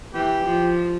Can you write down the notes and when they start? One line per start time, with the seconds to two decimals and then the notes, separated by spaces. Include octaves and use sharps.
0.14 E3 G4
0.45 F3